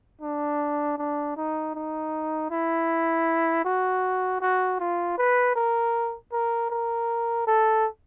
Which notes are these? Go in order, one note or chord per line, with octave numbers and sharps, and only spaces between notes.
D4
D4
D#4
D#4
E4
F#4
F#4
F4
B4
A#4
A#4
A#4
A4